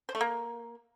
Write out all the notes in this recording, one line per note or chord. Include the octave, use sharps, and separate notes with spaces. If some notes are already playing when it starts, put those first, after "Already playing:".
C5
A3
A#3